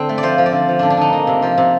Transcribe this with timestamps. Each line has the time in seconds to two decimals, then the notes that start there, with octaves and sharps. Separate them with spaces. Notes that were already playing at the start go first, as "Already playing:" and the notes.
Already playing: D3 C4 D4
0.09 A3
0.18 D5
0.23 F3 C5
0.38 F3
0.46 D5
0.53 D3
0.69 F3
0.79 D3 D4
0.90 D4
0.97 D3 D#4
1.13 A#3
1.27 C3
1.42 F3
1.58 C3